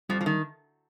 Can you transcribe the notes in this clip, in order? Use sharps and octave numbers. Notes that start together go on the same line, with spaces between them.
F2 F3 G3
F3
D#3